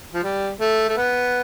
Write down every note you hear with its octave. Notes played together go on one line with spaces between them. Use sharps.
F3
G3
A3
A3
B3